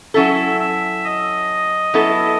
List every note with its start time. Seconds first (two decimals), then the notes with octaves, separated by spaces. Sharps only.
0.14 F#3 C#4 E4 A4 E5
0.60 E5
1.04 D#5
1.94 F#3 B3 E4 A4